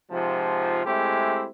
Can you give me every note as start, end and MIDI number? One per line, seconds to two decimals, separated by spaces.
0.11 0.81 44
0.11 0.81 48
0.11 0.81 53
0.86 1.48 56
0.86 1.48 57
0.86 1.48 60
0.86 1.48 64
0.86 1.48 67